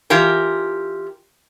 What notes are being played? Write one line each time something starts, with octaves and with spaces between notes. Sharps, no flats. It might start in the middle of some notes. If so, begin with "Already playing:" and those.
E3 F4 G4 A#4